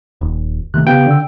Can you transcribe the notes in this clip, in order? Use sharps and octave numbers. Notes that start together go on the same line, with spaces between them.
D#1
C3 D#3 A3 F#6
C#3 B3 G4 F5 G5
D3 E6